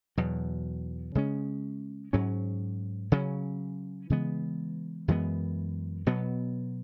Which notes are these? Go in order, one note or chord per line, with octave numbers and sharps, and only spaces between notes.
E2 B2 F#3
C#3 G#3 C#4
G#2 F#3 C#4
C#3 F#3 C#4
C#3 E3 G#3 B3
F#2 E3 G#3 B3
B2 F#3 B3